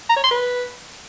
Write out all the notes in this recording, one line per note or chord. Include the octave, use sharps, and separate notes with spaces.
A#5
C#5
C6
B4